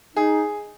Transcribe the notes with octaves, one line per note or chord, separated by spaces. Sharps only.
D#4 G#4